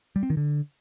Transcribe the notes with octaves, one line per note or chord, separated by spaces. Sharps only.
G3
C4
D#3
D3